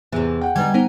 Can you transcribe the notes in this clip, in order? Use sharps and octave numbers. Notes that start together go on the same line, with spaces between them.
E2 C3 E3
F#5 G5
D3 G3 B3 D#4 G#5 G#6
B3 D#4 A#4 C5